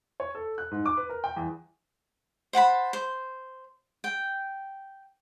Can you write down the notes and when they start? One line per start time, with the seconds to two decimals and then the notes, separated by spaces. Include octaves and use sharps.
0.20 C#5
0.35 A4
0.58 F#6
0.71 G#2
0.86 D6
0.97 B4
1.10 A#4
1.24 G5
1.36 E2
2.53 C5 F#5 A5 B5
2.93 C5
4.04 G5